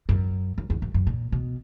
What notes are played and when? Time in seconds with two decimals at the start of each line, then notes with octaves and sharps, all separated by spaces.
0.09 F#2
0.58 F#2
0.70 E2
0.82 F#2
0.94 F#2
1.07 A#2
1.32 B2